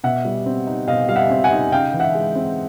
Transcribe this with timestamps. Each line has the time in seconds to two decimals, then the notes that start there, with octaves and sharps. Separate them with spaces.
0.04 B2 E5 F#5
0.25 G3
0.46 C4
0.67 D#4
0.87 B2 D#5 F5
1.09 G3 F5
1.16 E5 F#5
1.30 C4
1.44 F#5 G#5
1.51 D#4
1.72 C#3 F5 G5
1.94 E3
2.00 E5 F#5
2.14 G#3
2.35 C4